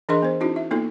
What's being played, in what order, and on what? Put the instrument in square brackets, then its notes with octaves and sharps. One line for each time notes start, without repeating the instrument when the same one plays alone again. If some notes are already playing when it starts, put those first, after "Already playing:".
[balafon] E3 D4 G#4 A#4 D#5 C6
B3 C5
C#4 D#4 E4 F#4
E5
A#3 B3 D#4 F4 A4